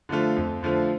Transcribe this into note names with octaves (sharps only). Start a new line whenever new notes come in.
D3 F3 A3 F4
F2
D3 F3 A3 F4